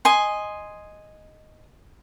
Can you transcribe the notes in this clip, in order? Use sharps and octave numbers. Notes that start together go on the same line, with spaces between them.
D#5 G#5 C6